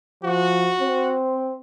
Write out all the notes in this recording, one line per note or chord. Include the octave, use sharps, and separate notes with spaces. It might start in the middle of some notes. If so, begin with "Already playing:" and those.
F3 F#4
C4